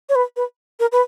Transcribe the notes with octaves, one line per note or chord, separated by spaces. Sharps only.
C#5
B4
B4
A#4
B4